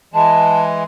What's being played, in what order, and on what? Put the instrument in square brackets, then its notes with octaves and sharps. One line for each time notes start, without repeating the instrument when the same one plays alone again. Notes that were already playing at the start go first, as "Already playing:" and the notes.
[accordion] E3 G#3 [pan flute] A5